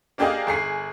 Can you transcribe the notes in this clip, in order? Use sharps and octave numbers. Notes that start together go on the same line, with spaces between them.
A#3 D4 G4 G#4 D#5 F5
G1 G#4 C7